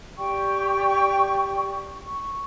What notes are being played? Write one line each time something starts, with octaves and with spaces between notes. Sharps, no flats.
G4 D5 G5 C#6
C#6